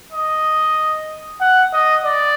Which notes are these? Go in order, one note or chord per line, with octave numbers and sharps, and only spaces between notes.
D#5
F#5
D#5
D5